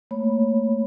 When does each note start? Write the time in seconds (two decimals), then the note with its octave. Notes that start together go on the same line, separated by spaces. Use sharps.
0.11 A3 A#3 C#5 B5